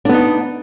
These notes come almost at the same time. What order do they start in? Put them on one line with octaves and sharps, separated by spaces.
D4 B3 D#4